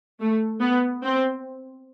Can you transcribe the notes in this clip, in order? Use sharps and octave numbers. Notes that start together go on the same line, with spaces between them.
A3
B3
C4